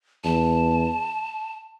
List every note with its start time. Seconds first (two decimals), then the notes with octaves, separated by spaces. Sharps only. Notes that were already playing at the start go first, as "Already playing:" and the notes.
0.24 E2 A5